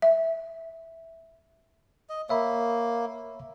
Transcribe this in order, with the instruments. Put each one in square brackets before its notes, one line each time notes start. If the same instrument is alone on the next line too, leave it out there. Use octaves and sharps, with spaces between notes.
[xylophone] E5
[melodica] D#5
[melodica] A#3 [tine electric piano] C#5 E5 B5